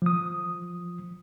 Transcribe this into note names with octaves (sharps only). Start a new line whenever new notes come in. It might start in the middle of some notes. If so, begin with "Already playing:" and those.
F3 D#6